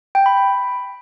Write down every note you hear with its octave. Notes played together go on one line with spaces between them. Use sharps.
G5
B5
B5